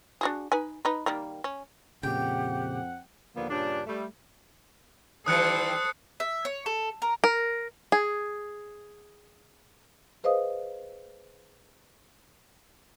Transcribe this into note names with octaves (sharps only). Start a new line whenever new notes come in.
D4 F#4 G#4
D#4 B4 G#5
D#4 B4
D#3 G3 A#3
C#4
F2 A#2 C#3 C4 G4 F#5 G5
D#2 A#2 D3 F3 A#3 B3
G2 A#2 C#3 D4
G3 A3
D#3 E3 G3 A4 C5 D#6 F#6 C#7
E5
C#5
A4
A#4
A#4
G#4
G#4 B4 C5 D#5 F5 D#6